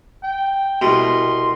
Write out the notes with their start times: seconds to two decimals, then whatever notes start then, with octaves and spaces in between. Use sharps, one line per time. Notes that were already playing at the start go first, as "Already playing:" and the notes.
0.23 G5
0.82 C2 B2 C6